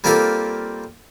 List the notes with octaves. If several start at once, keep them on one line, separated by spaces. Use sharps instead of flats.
G3 A#3 C4 F4 G4 A4